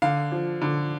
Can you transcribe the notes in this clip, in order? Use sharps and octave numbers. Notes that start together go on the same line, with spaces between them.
D3 F5
F3
D3